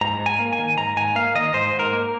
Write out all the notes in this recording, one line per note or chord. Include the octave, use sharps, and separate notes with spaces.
G#2 A#5
G#2
G#5
A#3
G#5
D#3
G#2 A#5
G#2 G#5
A#3 F5
D#3 D#5
G#2 C5
G#2
A#4
A#3